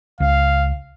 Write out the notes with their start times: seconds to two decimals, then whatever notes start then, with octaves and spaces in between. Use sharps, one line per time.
0.20 C#2 F5